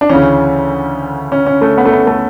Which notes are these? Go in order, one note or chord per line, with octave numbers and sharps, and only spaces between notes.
D4
D2 C#3 E3 C#4
C#4
C#4
A3
B3
A3
B3
A3